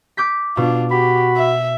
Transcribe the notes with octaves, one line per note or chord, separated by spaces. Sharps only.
D6 G6 B6
B2 D4 F4
F#4 G4 B5
E5